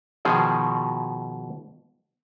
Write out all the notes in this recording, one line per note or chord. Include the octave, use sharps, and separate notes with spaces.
B2 D#3 F3 G#4